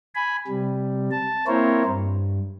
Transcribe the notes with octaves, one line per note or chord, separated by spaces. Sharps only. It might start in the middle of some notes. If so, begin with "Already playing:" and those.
G#5 B5
C3 G3
A5
A#3 C4 E4 A#4 C5 C#5
G2